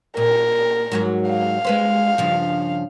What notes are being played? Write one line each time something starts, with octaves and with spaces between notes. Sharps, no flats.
A#2 A#4
G#2 F#3 F#4
F5
G#3 B4 C5
G2 C#3 F3